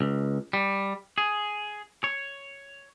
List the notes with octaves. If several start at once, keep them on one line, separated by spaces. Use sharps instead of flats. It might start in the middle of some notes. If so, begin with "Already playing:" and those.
C#2
G3
G#4
C#5